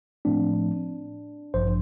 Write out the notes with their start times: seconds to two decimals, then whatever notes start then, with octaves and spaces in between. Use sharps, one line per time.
0.25 A2 F3 A3 C4 D4
1.54 A1 G2 F3 C5